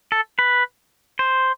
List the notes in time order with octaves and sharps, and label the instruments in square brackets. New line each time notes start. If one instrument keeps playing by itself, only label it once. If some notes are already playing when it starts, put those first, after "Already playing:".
[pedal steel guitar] A4
B4
C5